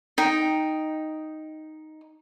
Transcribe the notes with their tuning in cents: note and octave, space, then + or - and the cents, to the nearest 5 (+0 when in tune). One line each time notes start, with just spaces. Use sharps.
D#4 +0 G5 +0